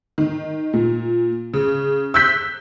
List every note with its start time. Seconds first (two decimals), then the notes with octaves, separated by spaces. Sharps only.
0.18 D#3
0.74 A#2
1.54 C#3
2.14 E6 F#6 G6 B6